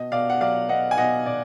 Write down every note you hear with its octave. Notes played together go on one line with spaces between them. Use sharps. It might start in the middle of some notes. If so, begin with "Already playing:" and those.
Already playing: B2 D#5
B2 D5 F5
F#5
F#3 D5 F5
B3 D#5 F#5
G#5
B2 D#5 F#5
B2 D5